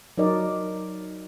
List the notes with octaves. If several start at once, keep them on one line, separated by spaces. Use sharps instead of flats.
F#3 D#4 A#4 D5 D#5